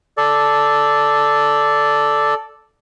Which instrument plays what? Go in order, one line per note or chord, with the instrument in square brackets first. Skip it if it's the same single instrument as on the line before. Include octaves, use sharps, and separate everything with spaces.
[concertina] A4 D5